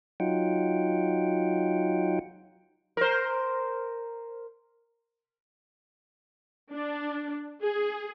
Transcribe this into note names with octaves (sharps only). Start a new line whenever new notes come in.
F#3 D#4 F4 F#5 G5
A#4 C5
D4
G#4